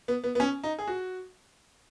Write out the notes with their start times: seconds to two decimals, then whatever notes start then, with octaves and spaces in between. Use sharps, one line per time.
0.08 B3
0.24 B3
0.35 B3
0.40 C#4
0.64 D#4
0.79 G#4
0.88 F#4